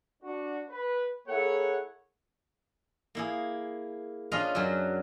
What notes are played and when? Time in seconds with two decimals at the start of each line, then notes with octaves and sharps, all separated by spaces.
0.23 D4 F#4
0.70 B4
1.28 A#3 E4 G#4 A4 C#5 F#5
3.15 A#3 E4 G#4
4.32 C#4 D4 F4 B4 D#5 F5
4.55 F#2 F#3